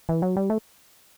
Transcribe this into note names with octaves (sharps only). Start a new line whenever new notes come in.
E3
F#3
G3
A3